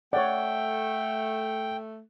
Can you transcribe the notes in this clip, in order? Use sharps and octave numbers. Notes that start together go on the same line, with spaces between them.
A3 C#5 D5 F#5 G5